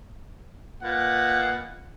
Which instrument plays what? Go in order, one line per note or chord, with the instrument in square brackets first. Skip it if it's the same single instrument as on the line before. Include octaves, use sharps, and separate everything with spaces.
[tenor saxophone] A#2 [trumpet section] B4 D#5 F#5